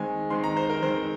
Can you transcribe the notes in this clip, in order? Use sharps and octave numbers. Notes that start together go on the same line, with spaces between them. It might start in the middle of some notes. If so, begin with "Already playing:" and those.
Already playing: D#3 G#3 C4 G#5
D#3 G#3 C4 C6
A#5
C5
A#4
D#3 G#3 C4 C5